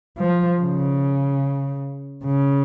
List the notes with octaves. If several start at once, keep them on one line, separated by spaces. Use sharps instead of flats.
F3
C#3
C#3